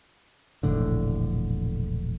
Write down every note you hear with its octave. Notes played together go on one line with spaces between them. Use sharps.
E1 A#1 A2 D3